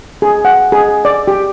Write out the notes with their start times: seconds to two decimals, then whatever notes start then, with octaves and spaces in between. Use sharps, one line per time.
0.22 G#4
0.45 F#5
0.72 G#4
1.05 D5
1.28 G4